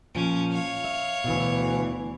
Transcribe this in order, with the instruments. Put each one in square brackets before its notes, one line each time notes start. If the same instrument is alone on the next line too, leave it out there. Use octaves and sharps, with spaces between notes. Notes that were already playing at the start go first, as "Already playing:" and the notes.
[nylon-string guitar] A#2 F3 [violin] C#4
[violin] C#5 F5
[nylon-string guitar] E5
[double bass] D2 E3 [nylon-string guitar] B2